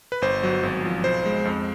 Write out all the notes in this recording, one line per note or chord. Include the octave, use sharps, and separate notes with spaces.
B4
G1 C5
F#3
G#1
F3
B1 C5
G#3
F2